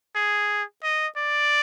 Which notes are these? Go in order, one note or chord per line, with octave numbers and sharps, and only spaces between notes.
G#4
D#5
D5